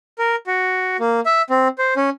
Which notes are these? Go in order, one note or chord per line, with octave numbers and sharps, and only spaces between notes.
A#4
F#4
A#3
E5
C4
C5
C#4